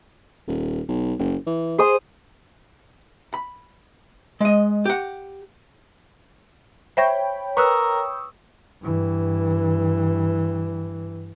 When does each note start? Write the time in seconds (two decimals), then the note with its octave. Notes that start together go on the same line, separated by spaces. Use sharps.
0.47 D#1
0.88 B1
1.19 F#1
1.47 E3
1.78 G#4 C5 D#6
3.34 B5
4.41 G#3 D#5
4.85 G4 F#5
6.97 C5 C#5 E5 G5 B5 A#6
7.57 A#4 B4 C#6 D#6 E6 F#6
8.82 G2 E3